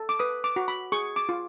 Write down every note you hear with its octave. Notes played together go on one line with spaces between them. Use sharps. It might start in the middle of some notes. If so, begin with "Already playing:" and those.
Already playing: A4
D6
B4 D#6
D6
F#4
B5
G#4 C#6
D6
F4